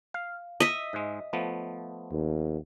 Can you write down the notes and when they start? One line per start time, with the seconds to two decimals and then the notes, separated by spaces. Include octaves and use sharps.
0.14 F5
0.60 D#5 E5
0.93 G#2 G#3
1.33 F3 A3 B3
2.12 D#2